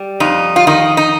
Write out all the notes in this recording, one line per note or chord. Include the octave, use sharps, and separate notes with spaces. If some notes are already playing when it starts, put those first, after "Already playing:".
Already playing: G3
F2 D#4
F4
D#3 D#4
D#4